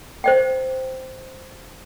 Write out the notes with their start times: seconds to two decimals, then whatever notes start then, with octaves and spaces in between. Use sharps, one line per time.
0.24 C5 D#5 G5